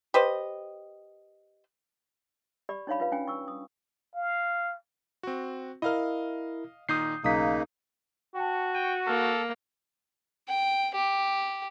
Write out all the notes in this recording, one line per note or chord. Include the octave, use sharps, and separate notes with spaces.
G4 B4 C5 D#5
G4 D5 B5
D4 D#4 C#5 D5 F5 B5
F4 B4 F5
C#4 D4 G5 G#5
C#6 E6
D#6
F5
C4 F#4
E4 A#4 D#5 F5 F6
A#2 D#3 D#4 D#6 G6 C7
B1 C#3 A#3 D#4 D#6 B6
F#4 G5 A5
G5 D#7
A#3 A4 F6
G5
G4